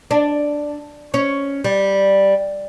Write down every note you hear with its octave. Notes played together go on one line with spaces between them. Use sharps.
D4
C#4 C#5
G3